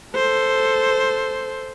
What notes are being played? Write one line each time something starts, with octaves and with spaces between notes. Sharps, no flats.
A4 C5